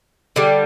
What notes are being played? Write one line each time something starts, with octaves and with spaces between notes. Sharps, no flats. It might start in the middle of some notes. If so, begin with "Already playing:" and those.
D3 G3 D4